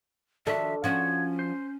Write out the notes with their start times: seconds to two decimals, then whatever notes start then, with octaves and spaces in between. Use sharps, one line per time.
0.47 D#3 F3 D4 F#4 A4 E5
0.84 F3 C#4 F#4 C#5
1.39 C5